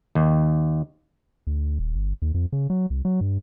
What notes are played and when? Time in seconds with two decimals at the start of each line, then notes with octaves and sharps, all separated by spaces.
0.15 D#2
1.47 D2
1.79 D#1
1.95 G1
2.22 D#2
2.34 F2
2.53 C#3
2.70 F#3
2.90 C2
3.05 F#3
3.21 G2